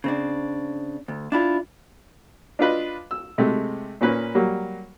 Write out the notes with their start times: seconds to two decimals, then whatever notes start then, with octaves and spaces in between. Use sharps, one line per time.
0.04 C#3 C4 D4
1.08 D2
1.32 D4 E4 F4
2.59 D4 F4 B4 D#5
3.11 E6
3.38 C3 G#3 A3
4.01 A#2 A#3 C#4 B4
4.35 F#3 G3 A#3